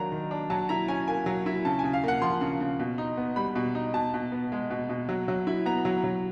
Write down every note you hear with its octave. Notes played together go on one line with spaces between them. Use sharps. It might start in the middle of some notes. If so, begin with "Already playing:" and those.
Already playing: D#3 F#3 A#3 D4 A#5
D#3
D4
F#3 A5
E4 A#5
C#4 G#5
A#3 G#5
F#3
E4
C#3 A5
C#3 G#5
F5
A#3 F#5
F3 C6
C#3
C#3
B2
D#4
B3
G3 B5
B2
D#4
B2 A5
B2
B3
G#3
B2
B2
F#3
F#3
E4
B3 A#5
F#3
F#3